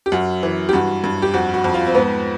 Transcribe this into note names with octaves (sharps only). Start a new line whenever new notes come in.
G4
F#2 F#4
E3
G4
G2 F#4
G2
G4
F2 F#4
F#4
F2
F4
C4
G#2 B3